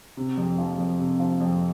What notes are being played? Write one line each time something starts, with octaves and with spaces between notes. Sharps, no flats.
C3
F2
F3
F2
C3
F3
F2